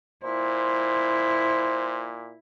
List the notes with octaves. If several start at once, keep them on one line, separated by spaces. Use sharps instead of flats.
A#2 E4 C5